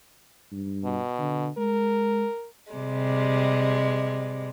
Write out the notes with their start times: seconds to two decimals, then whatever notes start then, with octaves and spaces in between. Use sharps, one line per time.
0.52 G2
0.85 B2
1.19 D3
1.58 G#3 A#4
2.73 C3 G3 G#3